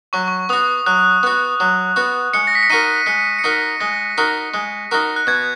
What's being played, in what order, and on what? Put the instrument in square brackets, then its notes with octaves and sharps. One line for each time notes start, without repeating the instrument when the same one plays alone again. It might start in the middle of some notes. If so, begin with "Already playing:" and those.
[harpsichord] F#3 [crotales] C#6
[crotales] C#6
[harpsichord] B3 F#4 [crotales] D#6
[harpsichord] F#3 [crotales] F#6
[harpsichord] B3 F#4
F#3
B3 F#4
[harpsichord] G#3 [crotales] C#7
[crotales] A#6
B6
C#7
[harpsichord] D#4 F#4 A#4 [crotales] D#7
[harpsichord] G#3 [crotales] C#7
[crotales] C#7
[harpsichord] D#4 F#4 A#4 [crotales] B6
[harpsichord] G#3 [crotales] A#6
[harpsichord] D#4 F#4 A#4
G#3
D#4 F#4 A#4
[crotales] F#6
[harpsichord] B2 [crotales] G#6